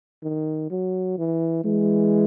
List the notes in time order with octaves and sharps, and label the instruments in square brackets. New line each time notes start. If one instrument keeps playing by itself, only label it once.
[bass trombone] D#3
F#3
E3
[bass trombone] E3 [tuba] G#3